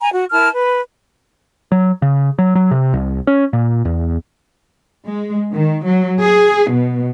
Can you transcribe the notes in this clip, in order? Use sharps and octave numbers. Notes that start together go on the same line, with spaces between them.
G#5 A#5
F#4
E4 A#4 A5 F6
B4
F#3
C#3
F#3
F#3
C3
C2
C#4
A#2
E2
G#3
D#3
F#3
G#4
B2